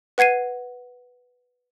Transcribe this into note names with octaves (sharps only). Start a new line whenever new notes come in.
B4 F#5 G#6 C7 D#7